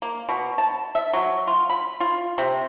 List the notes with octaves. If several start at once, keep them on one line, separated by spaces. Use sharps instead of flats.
A#3
B2
A5
E5
F#3
F4
B5
F4
C3